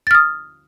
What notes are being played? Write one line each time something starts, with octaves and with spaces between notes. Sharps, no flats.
D#6 F6 A6